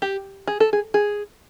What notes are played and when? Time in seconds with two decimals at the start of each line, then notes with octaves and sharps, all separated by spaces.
0.02 G4
0.47 G#4
0.60 A4
0.73 G#4
0.94 G#4